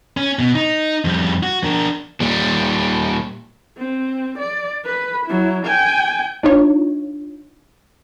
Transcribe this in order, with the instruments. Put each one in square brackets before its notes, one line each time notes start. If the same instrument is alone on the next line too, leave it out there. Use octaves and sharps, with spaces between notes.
[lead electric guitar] C#4
B2
D#4
F2 G3
F#4
D4 A#4
[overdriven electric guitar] A#2 G3
[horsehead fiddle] C4
D5
B4 B5
F#3 E4
G5 G#5
[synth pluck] D4 D#4 F4 C#5